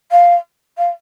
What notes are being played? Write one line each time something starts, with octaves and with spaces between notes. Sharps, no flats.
F5
F5